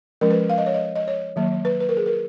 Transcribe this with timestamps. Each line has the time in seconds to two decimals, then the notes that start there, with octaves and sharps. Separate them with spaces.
0.21 F3 G#3 C#4 A#4
0.31 B4
0.49 F5
0.58 D#5
0.66 C#5
0.74 D#5
0.95 D#5
1.08 C#5
1.36 D#3 F#3 A#3
1.65 B4
1.80 B4
1.89 A#4
1.97 G#4
2.06 A#4